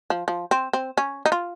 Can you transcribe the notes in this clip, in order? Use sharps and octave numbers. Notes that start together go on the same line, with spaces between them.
F3
F3
C4
C4
C#4
D#4
F4